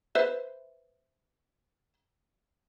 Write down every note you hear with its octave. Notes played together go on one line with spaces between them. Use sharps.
B4 C5 E5